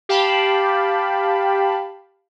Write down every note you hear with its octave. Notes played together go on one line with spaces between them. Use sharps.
G4 F5 G5 A5 B5